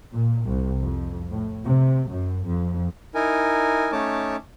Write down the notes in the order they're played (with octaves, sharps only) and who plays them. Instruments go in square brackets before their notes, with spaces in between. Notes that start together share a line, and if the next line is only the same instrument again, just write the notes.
[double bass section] A#2
C2
F2
A2
C3
F#2
F2
[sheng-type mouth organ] D#4 E4 A#4 G#5
A3 C#4 D#4 C#5 A5 D6